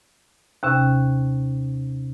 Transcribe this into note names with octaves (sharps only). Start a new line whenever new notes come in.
D#2 C3 C#4